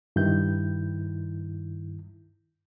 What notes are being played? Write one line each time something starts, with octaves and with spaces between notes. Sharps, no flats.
G2 D#3 E4 G6